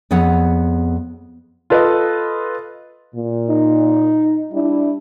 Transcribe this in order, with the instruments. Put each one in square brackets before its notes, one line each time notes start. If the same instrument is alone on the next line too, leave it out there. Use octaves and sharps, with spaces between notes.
[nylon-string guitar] F2 B3 G#4 C#5 F#5
[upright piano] F4 A4 B4 D#5
[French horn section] A#2
[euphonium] D#4
[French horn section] G3 D4 E4